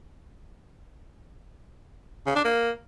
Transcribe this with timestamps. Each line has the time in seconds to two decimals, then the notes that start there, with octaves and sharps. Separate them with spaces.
2.26 C#3
2.35 D4
2.44 A#3